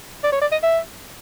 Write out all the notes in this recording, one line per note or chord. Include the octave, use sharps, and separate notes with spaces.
D5
C#5
D5
D#5
E5